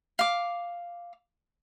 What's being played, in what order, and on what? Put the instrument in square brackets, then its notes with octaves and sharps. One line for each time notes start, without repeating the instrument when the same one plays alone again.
[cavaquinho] F5 D6